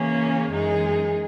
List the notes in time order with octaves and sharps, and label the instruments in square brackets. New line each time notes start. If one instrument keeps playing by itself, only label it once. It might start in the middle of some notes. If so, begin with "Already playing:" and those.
Already playing: [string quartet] C#3 E3 A#3 C#4 G#4
F#2 E3 G#3 D#4 G#4